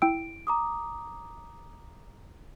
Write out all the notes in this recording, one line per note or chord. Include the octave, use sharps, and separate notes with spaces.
E4 G5 E6 D7
A#5 D6 D#6